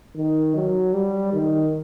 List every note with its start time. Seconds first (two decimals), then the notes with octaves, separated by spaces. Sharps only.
0.17 D#3
0.56 F#3
0.93 G3
1.33 D#3